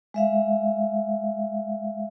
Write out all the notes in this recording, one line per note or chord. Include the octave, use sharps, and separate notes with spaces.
G#3 E5 F5